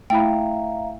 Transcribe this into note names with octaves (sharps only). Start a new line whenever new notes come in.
A3 E4 E5 F5 G5 A#5 B5